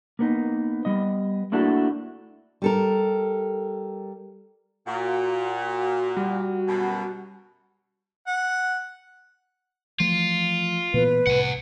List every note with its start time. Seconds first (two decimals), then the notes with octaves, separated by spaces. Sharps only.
0.19 A#3 B3 D#4
0.85 G3 B3 D#5
1.52 A3 A#3 D4 E4 F#4 A4
2.62 G3 A4 A#4
4.87 A#2 F#4
6.17 G3
6.67 F#2 B2
8.27 F#5
10.00 E3 F3 A3 F4
10.94 A#2 E3 B3 B4
11.27 C2 A2 C3 F#5 G#5